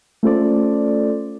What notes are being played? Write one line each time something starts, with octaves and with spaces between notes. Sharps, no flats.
A3 C#4 F4 A4 C5 D5